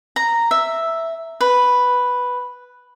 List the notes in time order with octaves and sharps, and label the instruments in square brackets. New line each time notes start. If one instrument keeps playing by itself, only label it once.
[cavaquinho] A#5
E5
B4